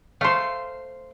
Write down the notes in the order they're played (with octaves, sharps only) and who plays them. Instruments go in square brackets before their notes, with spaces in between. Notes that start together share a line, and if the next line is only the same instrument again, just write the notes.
[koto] A3 C5 [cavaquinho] F5 C6